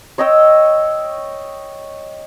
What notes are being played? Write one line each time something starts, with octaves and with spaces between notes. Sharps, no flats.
C#5 D#5 G5 E6